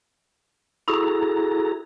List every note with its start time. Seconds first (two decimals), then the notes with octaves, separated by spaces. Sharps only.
0.88 E4 F#4 G#4 A4 A#5